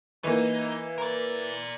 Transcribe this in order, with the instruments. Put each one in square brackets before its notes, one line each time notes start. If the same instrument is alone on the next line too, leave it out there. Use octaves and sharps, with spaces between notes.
[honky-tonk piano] E3 A#3 [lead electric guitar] D#4
[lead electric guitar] A#4 D5